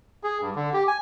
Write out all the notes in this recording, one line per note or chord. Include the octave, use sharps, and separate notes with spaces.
G#4
G2
D3
G4
G#5